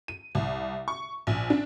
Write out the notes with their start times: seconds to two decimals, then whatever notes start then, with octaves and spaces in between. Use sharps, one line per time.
0.08 D#7
0.35 C2
0.88 C#6
1.27 A#1
1.50 D4